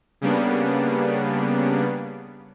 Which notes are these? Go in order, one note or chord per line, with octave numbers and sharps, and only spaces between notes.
C#3 G3 A#3 B3 D4